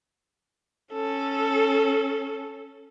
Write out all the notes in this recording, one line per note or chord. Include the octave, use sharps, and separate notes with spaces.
C#4 A4